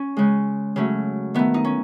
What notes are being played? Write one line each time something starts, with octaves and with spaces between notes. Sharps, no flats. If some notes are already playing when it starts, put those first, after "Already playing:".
Already playing: C#4
C#3 G#3
C#3 F#3 A3
D#3 A3 B3
D#4
C#4